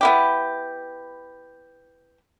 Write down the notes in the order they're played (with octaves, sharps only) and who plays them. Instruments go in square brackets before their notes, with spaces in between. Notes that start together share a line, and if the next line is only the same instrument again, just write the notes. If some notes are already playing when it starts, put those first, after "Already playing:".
[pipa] B3 E4 G4